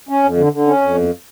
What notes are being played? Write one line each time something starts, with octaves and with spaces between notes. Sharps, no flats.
C#4
F2
D3
D3
C#4
F2
E2